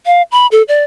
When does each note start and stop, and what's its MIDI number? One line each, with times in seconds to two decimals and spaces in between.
0.06 0.22 77
0.32 0.47 83
0.52 0.62 69
0.68 0.84 74